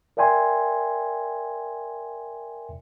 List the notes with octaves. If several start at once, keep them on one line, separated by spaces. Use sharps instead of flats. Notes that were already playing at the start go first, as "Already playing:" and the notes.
A#4 D5 E5 G5 G#5 C6